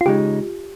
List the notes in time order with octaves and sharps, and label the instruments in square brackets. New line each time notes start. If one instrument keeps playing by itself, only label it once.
[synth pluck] F4
[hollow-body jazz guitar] C#3 G#3 D#4 [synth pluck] G4